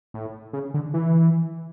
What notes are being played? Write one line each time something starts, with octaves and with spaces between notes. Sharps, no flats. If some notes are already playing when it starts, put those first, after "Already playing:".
A2
C#3
D3
E3